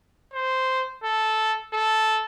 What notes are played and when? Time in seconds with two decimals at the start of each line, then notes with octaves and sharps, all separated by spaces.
0.33 C5
1.04 A4
1.74 A4